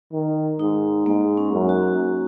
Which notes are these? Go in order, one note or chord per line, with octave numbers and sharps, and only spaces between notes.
D#3
G#2 D#4
G#2 A#3
C#4
F#2
F#4